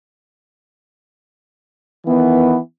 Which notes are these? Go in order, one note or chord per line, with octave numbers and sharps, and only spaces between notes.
D#3 E3 B3